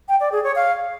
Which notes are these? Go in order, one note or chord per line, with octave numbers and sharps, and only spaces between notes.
G5
D5
G#4
C#5
F5